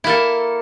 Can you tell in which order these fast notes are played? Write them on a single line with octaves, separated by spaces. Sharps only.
E4 A#3 A4